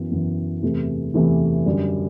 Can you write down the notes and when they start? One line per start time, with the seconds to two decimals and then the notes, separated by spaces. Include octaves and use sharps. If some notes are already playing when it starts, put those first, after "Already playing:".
Already playing: F#2 E3 B3
0.11 F#2 E3 B3
0.62 E2 C3 E3 A3
1.14 E2 C3 E3 A3
1.66 F#2 D3 G3